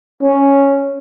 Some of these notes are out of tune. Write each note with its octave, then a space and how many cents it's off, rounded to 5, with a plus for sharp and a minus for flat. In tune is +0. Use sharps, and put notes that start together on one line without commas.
C#4 +0